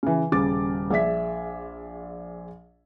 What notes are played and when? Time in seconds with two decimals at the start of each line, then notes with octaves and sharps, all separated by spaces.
0.03 C#3 E3
0.32 D#1 C#3 D6 A6
0.91 A#1 G#4 D5 E5 B6